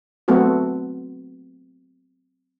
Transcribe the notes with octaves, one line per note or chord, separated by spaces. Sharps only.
F#3 A3 B3 C4 F#4